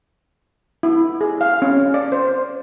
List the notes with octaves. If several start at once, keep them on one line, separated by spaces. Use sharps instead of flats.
E4
G#4
F5
C#4
D5
C5